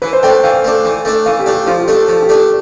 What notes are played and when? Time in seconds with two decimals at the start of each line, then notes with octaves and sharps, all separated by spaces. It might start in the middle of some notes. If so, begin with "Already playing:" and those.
0.02 E3 B4
0.13 C5
0.23 A3 D4 G5
0.33 G5
0.43 E3 F5
0.64 A3 D4
0.85 E3
1.05 A3 D4
1.26 E3 F5
1.39 G4
1.46 A3 D4
1.53 G4
1.67 F3 F4
1.81 G4
1.88 A3 D4
1.95 A4
2.08 F3 A4
2.22 G4
2.29 A3 D4
2.36 G4